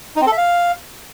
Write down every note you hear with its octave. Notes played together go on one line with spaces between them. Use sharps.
D#4
C4
A4
E5
F5